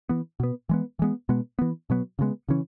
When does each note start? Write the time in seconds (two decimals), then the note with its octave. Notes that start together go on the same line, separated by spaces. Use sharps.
0.09 E3 B3
0.40 B2 B3
0.69 E3 G#3 B3
0.99 E3 G#3 B3
1.29 B2 G#3 B3
1.59 E3 B3
1.90 B2 F#3 B3
2.19 C#3 E3 G#3 B3
2.49 C#3 E3 C#4